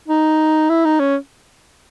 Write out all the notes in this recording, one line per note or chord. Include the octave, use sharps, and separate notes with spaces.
D#4
E4
D#4
C#4